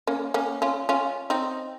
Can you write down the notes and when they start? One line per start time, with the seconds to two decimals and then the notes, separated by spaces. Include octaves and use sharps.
0.07 A#3 C#4
0.34 A#3 C#4
0.62 C#4 F4
0.89 C#4 F4
1.30 C4 D#4